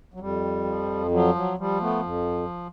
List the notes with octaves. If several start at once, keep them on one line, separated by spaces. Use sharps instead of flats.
F#3
F2 G3
F3
F3 F#3
F#3
F3 G3
A3 B3
F2